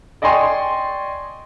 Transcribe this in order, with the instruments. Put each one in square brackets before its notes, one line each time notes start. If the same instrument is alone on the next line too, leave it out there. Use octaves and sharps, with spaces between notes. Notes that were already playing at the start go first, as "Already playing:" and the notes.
[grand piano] D5 D#5 G5 G#5 C6 C#6